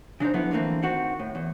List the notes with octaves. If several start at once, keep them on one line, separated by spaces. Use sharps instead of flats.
C#3 D4 D#4 C5
D3 F3 F#3 B3 E4
D3 E3 A3 A#3 C4
D#3 C4 F#4
A2
E2